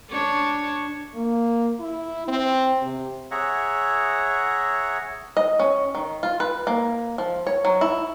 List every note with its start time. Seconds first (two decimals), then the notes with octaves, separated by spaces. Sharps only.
0.10 D4 C#5
1.15 A#3
1.80 E4
2.28 C4
2.82 C3
3.31 G#4 C#5 E5 F#5 A#5
5.37 D#5
5.60 C#4
5.95 D#3
6.23 F4
6.40 B4
6.67 A#3
7.18 F3
7.47 C#5
7.65 F#3
7.81 E4